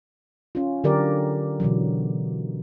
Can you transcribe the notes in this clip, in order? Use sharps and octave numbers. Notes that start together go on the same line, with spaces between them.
C#4 F4
D3 F#3 G4 A#4 D5
B2 D3 E3 F#3